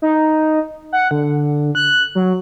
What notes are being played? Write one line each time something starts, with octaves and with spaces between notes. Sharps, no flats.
D#4
F#5
D3
F#6
F#3